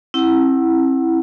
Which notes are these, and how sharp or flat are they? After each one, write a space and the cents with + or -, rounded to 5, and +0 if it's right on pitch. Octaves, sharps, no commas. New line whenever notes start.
C4 +40 E4 +0 F#5 +15